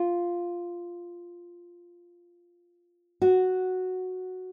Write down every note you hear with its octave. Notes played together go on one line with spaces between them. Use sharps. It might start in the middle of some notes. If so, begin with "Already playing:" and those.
Already playing: F4
F#4